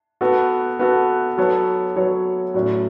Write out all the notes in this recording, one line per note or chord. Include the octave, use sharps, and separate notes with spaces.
B3 F#4 A4
B3 F#4 A4
F#3 B3 A4 C#5
F#3 B3 A4 C#5
A2 F#3 C#4